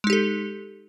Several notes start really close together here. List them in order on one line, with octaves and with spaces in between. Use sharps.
G#3 D#4 G4 A4